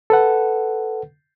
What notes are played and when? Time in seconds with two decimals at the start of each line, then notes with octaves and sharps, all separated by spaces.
0.10 A4 B4 F#5